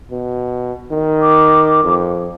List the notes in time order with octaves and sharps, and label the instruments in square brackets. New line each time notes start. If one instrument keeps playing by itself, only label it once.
[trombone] B2
D#3
[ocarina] D6
[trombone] F2